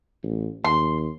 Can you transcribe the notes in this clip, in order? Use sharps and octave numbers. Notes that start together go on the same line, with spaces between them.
A1
D#2 C6